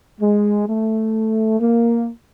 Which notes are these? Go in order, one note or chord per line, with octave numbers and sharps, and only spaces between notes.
G#3
A3
A#3